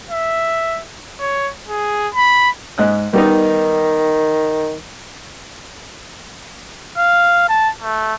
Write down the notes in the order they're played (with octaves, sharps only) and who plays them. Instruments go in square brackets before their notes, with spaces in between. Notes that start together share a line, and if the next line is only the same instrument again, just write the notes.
[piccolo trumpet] E5
C#5
G#4
B5
[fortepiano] G#2 D#5 F#6
[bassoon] D#3 [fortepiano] G3 B3 D#4
[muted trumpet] F5
A5
A3